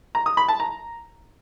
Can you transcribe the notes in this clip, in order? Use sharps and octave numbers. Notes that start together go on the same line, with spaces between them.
A#5
D#6
B5
A5
A#5